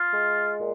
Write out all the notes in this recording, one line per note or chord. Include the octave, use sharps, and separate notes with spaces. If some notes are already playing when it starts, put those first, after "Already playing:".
Already playing: F4
G#3
A#2